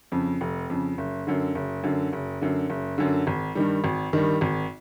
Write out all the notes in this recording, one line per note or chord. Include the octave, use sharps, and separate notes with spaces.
F2 C#3
F1
F2 C#3
F#1
F#2 D3
F#1
F#2 D3
F#1
F#2 D3
F#1
F#2 D3
G#1
G2 D#3 G3
G#1
G2 D#3 G3
G#1